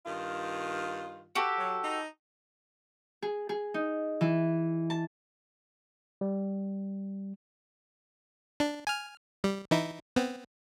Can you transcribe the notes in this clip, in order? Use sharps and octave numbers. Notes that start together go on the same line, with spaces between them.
G2 D#3 F4
F#4 G4 A4
F#3
D#4
G#4
G#4
D#4
E3
A5
G3
D4
G#5 F6
G3
E3 D#4 E4
B3 C4